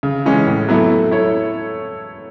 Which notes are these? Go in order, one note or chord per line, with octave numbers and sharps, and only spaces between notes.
C#3
E3 G#3 C#4
A2
F#3 B3 E4 A4
A3
E4 A4 C#5